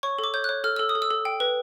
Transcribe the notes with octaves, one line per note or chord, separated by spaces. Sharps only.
C#5 C#6
A4
D6
C#5 G6
C#5 F#6
A4 F6
A4 E6
D#6
A4
E6
A4
G5
B4